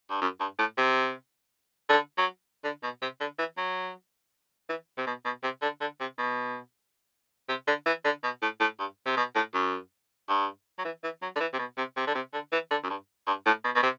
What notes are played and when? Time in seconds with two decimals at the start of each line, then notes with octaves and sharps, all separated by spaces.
0.11 G2
0.22 F#2
0.40 G2
0.59 A2
0.78 C3
1.90 D3
2.18 F#3
2.64 D3
2.83 B2
3.02 C3
3.20 D3
3.39 E3
3.57 F#3
4.69 E3
4.98 C3
5.07 B2
5.25 B2
5.43 C3
5.62 D3
5.81 D3
6.00 C3
6.18 B2
7.49 C3
7.68 D3
7.86 E3
8.05 D3
8.24 B2
8.42 A2
8.61 A2
8.79 G2
9.06 C3
9.17 B2
9.36 A2
9.54 F#2
10.29 G2
10.79 F#3
10.85 E3
11.04 E3
11.22 F#3
11.36 D3
11.40 E3
11.54 C3
11.59 B2
11.78 C3
11.97 C3
12.07 D3
12.15 C3
12.34 D3
12.53 E3
12.71 D3
12.84 F#2
12.90 G2
13.27 G2
13.46 A2
13.64 B2
13.76 B2
13.83 C3